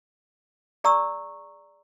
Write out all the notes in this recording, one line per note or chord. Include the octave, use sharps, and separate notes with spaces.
G#4 D5 A#5 C#6 E6